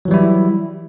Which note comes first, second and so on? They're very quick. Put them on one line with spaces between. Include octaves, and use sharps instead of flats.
F#3 E3 G3 E4